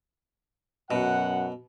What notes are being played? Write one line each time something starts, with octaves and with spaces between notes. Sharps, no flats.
F#2 B2 F#5